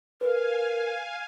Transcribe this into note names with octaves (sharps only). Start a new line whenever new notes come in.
A#4 B4 F5 G#5